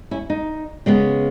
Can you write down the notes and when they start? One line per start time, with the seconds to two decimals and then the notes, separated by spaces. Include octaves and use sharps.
0.11 C#4 E4
0.30 D#4
0.86 C#3 G#3 B3